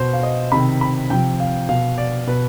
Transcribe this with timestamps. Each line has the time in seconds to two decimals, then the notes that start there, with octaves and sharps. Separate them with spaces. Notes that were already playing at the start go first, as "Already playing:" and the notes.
Already playing: B2 C5
0.13 F5
0.23 D#5
0.52 C3 D#3 B5
0.81 B5
1.10 C3 F3 G5
1.40 F5
1.69 B2 F5
1.98 D5
2.27 B2 B4